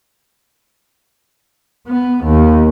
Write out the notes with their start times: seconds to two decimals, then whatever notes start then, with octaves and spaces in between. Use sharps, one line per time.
1.87 B3
2.24 D#2